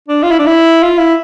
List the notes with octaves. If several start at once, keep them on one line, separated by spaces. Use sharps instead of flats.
D4
F4
E4
D4
E4
F4
E4